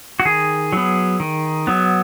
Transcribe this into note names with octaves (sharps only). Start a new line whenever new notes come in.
F#4
D#3 G#4
F#3 B3
D#3
F#3 B3